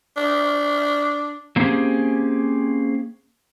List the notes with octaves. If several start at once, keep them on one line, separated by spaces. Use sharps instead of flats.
D4
F#3 A#3 C4 C#4 G4 G#4